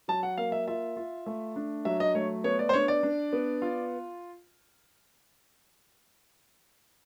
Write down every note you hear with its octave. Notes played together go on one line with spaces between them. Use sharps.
F#3 A5
F#5
A#3 F5
E5
F4 E5
F4
A3
D4
F#3 E5
D#5
A3 C#5
B3 C#5
D5
C5
D4 C#5
D5
D4
B3
F4